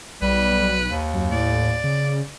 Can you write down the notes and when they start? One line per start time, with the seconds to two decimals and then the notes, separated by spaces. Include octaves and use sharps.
0.22 B1 G3 B4
0.89 D#2
1.14 F#2
1.32 A2 D5
1.84 C#3